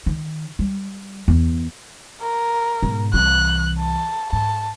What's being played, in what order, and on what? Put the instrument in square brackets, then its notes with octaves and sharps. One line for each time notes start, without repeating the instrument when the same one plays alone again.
[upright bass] D#3
G3
E2
[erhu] A#4
[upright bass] G#2 B2
[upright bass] C2 E3 [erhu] F#6
[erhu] A5
[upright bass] G#2 [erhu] A5